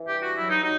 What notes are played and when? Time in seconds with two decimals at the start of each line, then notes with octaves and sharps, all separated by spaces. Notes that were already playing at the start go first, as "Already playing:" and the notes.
Already playing: E3
0.08 G2 G4
0.22 F#4
0.36 F#3 E4
0.49 D#4
0.63 F#3 D#4